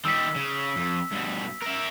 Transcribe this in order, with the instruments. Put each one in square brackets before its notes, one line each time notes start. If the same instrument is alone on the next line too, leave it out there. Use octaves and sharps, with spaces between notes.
[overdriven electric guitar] D#3 G3 [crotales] E6 B6
[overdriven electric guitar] C#3
F2
G2 B2
A#4 E5